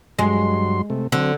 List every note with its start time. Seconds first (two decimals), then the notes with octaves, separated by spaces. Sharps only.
0.19 G2 F#3 G#3 C6
0.90 C3 A3
1.12 D3 F#3 C4